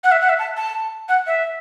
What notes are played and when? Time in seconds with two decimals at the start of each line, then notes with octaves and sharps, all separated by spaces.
0.04 F#5
0.12 E5
0.21 F#5
0.29 E5
0.39 A5
0.57 A5
1.09 F#5
1.27 E5